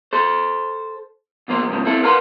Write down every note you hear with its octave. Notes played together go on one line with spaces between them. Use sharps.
A4 C5
E2 F3 A#3 C5
F2 G#2 C#3 F3
C4 E4 A4
A#4 B4 F5 F#5 A#5 C6